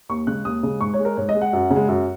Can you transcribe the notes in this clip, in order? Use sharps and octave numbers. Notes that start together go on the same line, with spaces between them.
D#2 C#6
C#3 G#3 F#6
D#2 D#6
C#3 G#3
G#2 C#6
C#5
G#3
A#4
G#2 C#5
D#5
G#3
F#5
F#2
C#3
G#3
F#2